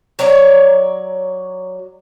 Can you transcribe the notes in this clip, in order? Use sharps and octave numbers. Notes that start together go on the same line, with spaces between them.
F#3 C#5 D5 A#5